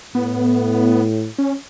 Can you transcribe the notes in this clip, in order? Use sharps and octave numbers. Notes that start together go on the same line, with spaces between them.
A2 B3
C#4